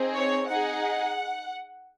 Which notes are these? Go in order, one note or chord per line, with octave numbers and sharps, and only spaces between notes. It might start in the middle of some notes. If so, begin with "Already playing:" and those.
Already playing: C4 D#4 G#4
C#5
D#4 G#4 F#5